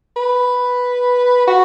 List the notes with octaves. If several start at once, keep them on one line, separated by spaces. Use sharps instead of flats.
B4
F#4